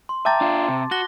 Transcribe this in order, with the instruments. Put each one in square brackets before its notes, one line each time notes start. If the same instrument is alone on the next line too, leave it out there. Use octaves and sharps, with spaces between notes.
[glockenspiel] C6
[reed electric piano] E5 G5 A#5 [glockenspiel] A5 D6 A6
[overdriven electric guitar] D4 F4
C3
[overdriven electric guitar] F#4 [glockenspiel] F#6 A#6 G7